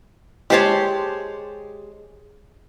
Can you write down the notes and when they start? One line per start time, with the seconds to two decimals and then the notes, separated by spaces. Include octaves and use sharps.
0.50 G#3 G4 C5 C#5 A5